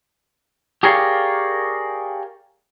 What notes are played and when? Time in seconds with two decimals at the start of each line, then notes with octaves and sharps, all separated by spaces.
0.83 G4 G#4 A#4 C#5 D5 F5